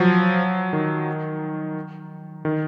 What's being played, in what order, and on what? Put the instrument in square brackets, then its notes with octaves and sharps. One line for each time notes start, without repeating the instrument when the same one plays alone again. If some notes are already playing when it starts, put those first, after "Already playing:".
Already playing: [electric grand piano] F3 F#3
D#3
D#3